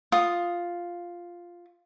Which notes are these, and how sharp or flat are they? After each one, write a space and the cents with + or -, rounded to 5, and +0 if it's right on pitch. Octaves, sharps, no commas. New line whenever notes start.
F4 +0 D#6 +0